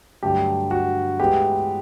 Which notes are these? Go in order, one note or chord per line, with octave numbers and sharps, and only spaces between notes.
G2 D3 F#3 A3 G4
F#4
A2 E3 G#3 B3 G4